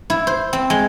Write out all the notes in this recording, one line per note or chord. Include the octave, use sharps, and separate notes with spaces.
E4
C5
C4
G#3